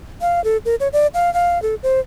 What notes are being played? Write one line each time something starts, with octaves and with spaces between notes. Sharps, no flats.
F5
A4
A#4
C#5
D5
F5
F5
A4
C5